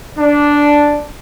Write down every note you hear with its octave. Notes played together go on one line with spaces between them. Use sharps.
D4